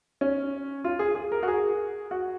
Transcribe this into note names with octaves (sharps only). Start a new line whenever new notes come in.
C#4
F4
G#4
G#4
A#4
F#4
G#4
F#4